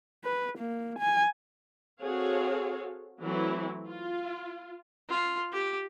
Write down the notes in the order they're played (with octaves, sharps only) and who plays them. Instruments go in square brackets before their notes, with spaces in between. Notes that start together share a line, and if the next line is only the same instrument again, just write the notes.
[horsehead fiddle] B4
A#3
G#5
[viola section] C4 F#4 G#4 A4 C#5 F5
E3 F#3 A3 C4 E4
F4
[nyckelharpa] F4
G4